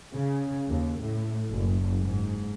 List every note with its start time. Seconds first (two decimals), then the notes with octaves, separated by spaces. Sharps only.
0.13 C#3
0.69 D#2
1.01 A2
1.52 F#1
2.00 G#2